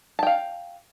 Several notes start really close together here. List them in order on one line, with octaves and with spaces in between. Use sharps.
A5 G5 F5